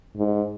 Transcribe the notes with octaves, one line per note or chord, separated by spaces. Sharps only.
G#2